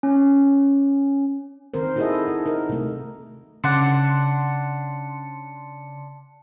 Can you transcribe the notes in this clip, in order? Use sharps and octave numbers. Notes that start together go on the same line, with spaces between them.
C#4
D#3 C4 A#4 C5
D#4 E4 F#4 G#4 A4 D#5
D#4
D#4 A#4
C3 A3
C#3 D4 F#5 C6 C#7